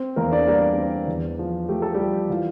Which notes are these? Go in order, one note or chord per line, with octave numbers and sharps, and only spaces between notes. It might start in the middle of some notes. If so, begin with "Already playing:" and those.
Already playing: C4
E2 A#3 A#4
D4 D5
G3 A#3 A#4
C4
E2
F3
A3 G4
A4
G3 G4
F3
E3 F4